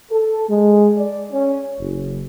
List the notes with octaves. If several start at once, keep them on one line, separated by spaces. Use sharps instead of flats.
A4
G#3
D5
C#4
F#1